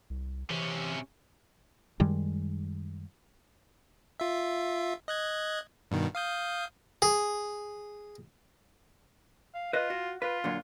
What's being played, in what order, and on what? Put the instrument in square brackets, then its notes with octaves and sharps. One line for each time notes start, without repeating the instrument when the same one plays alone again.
[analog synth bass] C2
[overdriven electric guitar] C3 C#4 [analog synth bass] E3
[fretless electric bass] F#2 D#3 G3 G#3
[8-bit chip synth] F4 E5
D#5 F#6 G#6
G2 B2 D#3
F5 D#6 G6
[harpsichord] G#4
[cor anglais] F5
[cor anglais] F4 [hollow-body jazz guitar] B4 D#5
[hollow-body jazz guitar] F#4
[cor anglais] F4 [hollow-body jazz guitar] B4
[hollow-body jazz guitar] A#2 D3 F#3